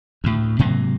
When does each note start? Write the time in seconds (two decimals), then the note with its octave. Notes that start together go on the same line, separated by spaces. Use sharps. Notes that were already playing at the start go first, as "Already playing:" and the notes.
0.24 D2 A2
0.59 G#2 C3 F#3 A#3